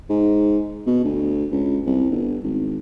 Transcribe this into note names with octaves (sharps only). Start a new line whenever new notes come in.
G#2
B2
D2
C#2
C2
G1
G#1